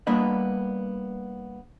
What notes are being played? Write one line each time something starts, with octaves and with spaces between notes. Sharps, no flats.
G3 A#3 B3 D4 B4 D#5